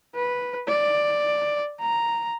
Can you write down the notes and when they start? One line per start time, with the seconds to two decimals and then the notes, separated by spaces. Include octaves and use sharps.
0.15 B4
0.68 D5
1.81 A#5